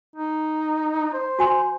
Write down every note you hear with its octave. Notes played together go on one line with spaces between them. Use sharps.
D#4
C5
F#4 G#5 C6